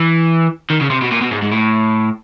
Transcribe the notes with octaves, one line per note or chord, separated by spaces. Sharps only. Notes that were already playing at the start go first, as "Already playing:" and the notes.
Already playing: E3
D#3
C#3
C3
B2
A#2
B2
G#2
G#2
A2